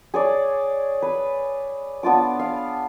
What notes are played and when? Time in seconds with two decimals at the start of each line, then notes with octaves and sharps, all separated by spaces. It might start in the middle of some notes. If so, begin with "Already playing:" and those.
0.14 G#4 C#5 D5
1.02 B4
2.03 B3 D4 F4 D6
2.39 F5